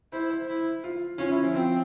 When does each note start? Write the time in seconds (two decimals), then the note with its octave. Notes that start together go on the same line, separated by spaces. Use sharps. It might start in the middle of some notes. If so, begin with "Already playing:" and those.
0.12 E4 C5
0.30 C5
0.48 E4
0.84 F4
1.18 C#4 F4
1.30 E4
1.43 F3
1.54 F3 C4